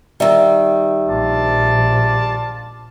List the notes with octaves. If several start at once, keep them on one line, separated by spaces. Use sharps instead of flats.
D#3 G3 E5 E6
A#1 F4 D5 A5